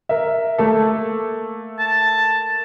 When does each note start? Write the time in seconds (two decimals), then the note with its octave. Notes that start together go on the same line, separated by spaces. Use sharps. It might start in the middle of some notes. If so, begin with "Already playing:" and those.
0.09 A#4 E5
0.58 A3 A#3 A4
1.79 A5